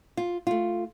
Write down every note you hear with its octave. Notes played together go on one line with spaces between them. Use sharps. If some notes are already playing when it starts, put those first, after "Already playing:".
F4
A3 F4